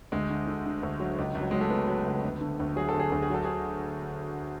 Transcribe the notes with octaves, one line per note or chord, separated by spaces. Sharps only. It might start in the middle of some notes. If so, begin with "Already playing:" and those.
D2 G#3
D3
D3
D3
D2
F#3
C#2
C#2
F#3
F#3 G#3
A3
F#3 B3
F#3
C#2
D2
D3
D2
F#3 G#4
A4
D2
G#4
D2 A4
G#4
F#3 A4
G#4